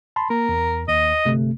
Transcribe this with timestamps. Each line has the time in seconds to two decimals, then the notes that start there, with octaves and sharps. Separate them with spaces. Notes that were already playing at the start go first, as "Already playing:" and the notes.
0.16 A5 B5 C6
0.30 A#3 A#4
0.49 E2
0.88 D#2 D#5
1.25 G1 C3 A3